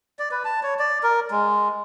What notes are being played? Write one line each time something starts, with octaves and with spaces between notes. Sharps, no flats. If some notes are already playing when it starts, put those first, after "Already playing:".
D5
B4
A5
C#5
D5
A#4
G#3